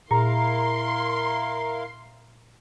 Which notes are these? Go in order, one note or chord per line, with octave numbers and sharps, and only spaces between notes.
A#2 E4 A#4 F5 A#5 C6